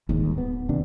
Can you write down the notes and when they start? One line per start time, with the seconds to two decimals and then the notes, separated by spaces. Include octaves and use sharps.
0.09 D1 G1 D#2 G#2
0.38 B3
0.69 D#2 C3 D4